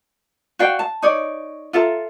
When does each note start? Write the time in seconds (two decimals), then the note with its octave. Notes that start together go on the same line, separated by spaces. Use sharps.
0.59 F#4 D5 F5 G5
0.79 A5
1.02 D#4 C#5 D5
1.73 F4 A4 E5 A#5